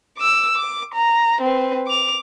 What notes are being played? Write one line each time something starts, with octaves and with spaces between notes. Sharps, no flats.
D6 E6
D6
A#5
C4 B4
D6 F7